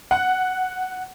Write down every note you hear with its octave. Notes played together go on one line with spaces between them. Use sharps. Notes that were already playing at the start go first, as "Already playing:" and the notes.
F#5